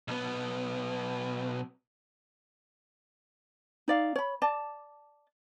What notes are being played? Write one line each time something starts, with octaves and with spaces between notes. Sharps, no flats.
B1 B3
D#4 D5 F5
C#5 B5
D5 A5